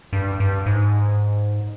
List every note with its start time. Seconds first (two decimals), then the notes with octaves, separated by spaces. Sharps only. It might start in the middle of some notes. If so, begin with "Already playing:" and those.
0.13 G2
0.40 G2
0.66 G#2